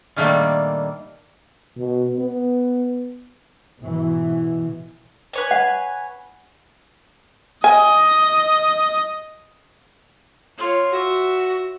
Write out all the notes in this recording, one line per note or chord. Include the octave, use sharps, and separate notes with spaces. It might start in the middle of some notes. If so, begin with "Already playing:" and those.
A#2 D#3 G3 A3 A#3 D4
B2
B3
G#2 B2 E3
B4 C#5 G#5
F#5
D#5 G#5
F4 C#5
F#4 E5